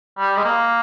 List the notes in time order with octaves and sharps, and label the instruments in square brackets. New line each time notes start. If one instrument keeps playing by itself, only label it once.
[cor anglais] G3
G#3
A#3